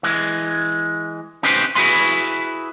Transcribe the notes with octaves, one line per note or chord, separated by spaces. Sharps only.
E3 G#3
C#4 D#4 G4 B4 C5 D#5
E4 F#4 G#4 B4 G#5 C6